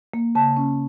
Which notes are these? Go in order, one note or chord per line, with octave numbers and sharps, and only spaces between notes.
A#3
C#3 A5
C#4